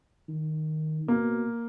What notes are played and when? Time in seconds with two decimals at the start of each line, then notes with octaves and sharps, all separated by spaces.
0.29 D#3
1.08 B2 A#3